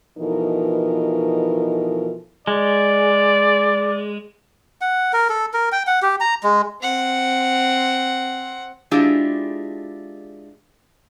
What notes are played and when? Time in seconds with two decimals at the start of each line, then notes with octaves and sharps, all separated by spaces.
0.18 B2 E3 F3 D#4 A4 A#4
2.47 G#3 D5
4.81 F#5
5.13 A#4
5.29 A4
5.54 A#4
5.72 G5
5.87 F#5
6.02 G4
6.20 A#5
6.43 G#3
6.82 C4 F#5
8.91 G#3 D4 E4 F4 G4 G#4